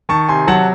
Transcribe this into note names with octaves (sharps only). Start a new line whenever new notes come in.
D#3 A5 C#6
C3 G#5 C6
F#3 F#5 A5